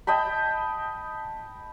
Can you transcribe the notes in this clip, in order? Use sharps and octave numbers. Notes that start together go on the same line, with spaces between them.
D#5 G5 A5 B5